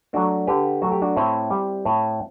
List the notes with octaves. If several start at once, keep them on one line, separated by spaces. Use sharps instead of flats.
F#3 A3 D4 F#4
D3 G4 B4
F#3 A3 F#4
G4
D4 F#4
A2 C4 E4
G3
A2